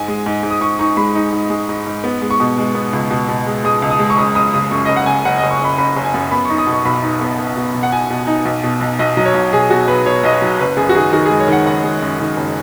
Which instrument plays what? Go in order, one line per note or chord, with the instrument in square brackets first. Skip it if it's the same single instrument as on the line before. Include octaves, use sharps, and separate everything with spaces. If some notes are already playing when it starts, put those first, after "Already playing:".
Already playing: [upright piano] G#2 G#5
G#3
G#2
G#2
D#6
G#2 C#6
D#4 C#6
G#3 B5
D#4
G#2
G#3
G#2
G#2
B3
G#3
C#6
B2
G#3
B3
C#2
B2
B2
G#3
G#3 D#6
C#2
D#6
G#3
C#6
F#1 D#6
F#1 D#6
C#3 D#6
F#2 C#6
F#1 D#5
F#5
C#3 G#5
F#1 F#5
F#1 D#5
C#6
F#1 B5
F#1 B5
F#1
G#5
F#2
B3 B5
D#4 C#6
D#6
B2
C#6
B1 B5
D#4
B3
B3
B2
B1
F#5
B2 G#5
B2
D#4
B1
B2
B1
B1 D#5
F#3 D#5
C#5
B1
B1 G#4
B2 F#4
B1 B4
B2 C#5
B1 D#5
C#5
F#3
F#1 B4
F#2 G#4
F#4
D#3 G#4
D#3 F#4
G#3 G#4
C#5
D#3 F#5
F#1 F#5
G#3
F#2
D#3
F#1